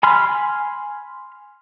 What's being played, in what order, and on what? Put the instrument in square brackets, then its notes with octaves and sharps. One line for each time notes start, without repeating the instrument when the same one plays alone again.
[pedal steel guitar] G#5 B5 C6 F6